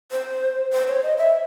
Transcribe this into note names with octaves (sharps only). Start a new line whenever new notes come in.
C5
C5
C#5
D#5
E5